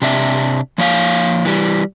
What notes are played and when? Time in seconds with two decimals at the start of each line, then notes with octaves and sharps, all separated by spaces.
0.02 C3 D4 E5
0.78 F3 A#3 C#5 F5
1.45 E3 G3